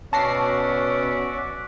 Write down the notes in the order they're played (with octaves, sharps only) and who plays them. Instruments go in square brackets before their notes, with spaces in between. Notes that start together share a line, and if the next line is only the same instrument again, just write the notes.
[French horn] B2 [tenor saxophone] C#4 [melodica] F#4 D5 E5 [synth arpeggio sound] A5 A#6 C7